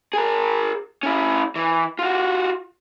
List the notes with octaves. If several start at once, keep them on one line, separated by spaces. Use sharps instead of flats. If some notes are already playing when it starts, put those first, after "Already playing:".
G#4 A#4
C#4 E4
E3
F4 F#4